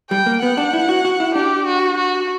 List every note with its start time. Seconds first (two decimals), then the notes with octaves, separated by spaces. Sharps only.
0.11 G3 G5
0.26 A#3
0.42 B3 F#5
0.57 D4
0.73 E4
0.89 F#4
1.05 F#4
1.20 E4
1.35 D4 G4
1.66 F#4
1.98 F#4